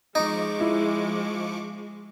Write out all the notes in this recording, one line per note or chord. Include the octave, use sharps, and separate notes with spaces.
F3 G#3 D#4 C#6 D6
E4